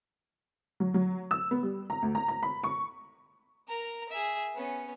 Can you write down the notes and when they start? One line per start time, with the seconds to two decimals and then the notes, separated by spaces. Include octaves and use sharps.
0.80 F#3
0.94 F#3
1.31 E6
1.51 B3
1.63 G3
1.90 A#5
2.02 D2
2.15 A#5
2.28 A#5
2.43 B5
2.64 C#6
3.68 A#4 A#5
4.10 G#4 E5
4.55 B3 C#4